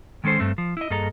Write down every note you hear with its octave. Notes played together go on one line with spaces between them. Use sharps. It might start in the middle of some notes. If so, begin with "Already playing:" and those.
D#3 G#3 C#4 A4 C5
G2 A3 C4
F3
E4 D#5
G2 A#3 G#4 A4 D#5 A#5